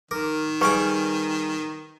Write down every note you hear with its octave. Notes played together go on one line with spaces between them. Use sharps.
D#3 A#4 D6
G3 G#4 B4 G5 C#6 D6